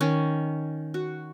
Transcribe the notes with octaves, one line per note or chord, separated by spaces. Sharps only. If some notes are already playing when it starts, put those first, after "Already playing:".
D#3 C#4
F#4